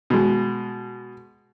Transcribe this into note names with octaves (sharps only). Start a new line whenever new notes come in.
B2 G#3